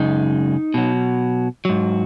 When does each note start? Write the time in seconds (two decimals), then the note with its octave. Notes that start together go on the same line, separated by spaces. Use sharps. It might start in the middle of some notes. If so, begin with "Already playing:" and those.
Already playing: F#2 C#3 G#3 D#4
0.74 B2 F#3
1.65 G#2 F#3